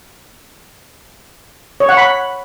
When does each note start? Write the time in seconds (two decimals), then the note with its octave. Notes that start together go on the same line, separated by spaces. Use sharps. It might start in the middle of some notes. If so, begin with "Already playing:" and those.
1.80 C#5
1.89 F#5
1.97 B5